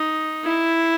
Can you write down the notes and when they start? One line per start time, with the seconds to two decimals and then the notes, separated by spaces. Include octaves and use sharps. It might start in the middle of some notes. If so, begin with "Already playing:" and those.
Already playing: D#4
0.44 E4